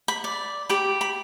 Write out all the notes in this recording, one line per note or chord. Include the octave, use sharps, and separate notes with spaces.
B5
D5
G4 B5
B5